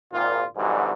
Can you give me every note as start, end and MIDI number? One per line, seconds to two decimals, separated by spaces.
0.13 0.44 32
0.13 0.44 46
0.13 0.44 65
0.57 0.93 44
0.57 0.93 47
0.57 0.93 50
0.57 0.93 52
0.57 0.93 54
0.57 0.93 55